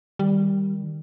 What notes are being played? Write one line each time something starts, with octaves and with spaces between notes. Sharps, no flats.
D#3 G3